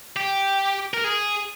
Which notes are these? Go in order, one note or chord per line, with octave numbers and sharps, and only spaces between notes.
G4
A#4
G#4